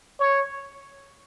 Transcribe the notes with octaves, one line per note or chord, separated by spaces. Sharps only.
C#5